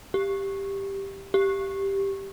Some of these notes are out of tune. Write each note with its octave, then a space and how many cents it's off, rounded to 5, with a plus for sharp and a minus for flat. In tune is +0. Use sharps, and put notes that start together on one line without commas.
G4 +5
G4 +0